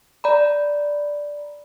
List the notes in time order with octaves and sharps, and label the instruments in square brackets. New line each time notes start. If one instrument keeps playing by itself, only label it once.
[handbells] D5 A#5 B5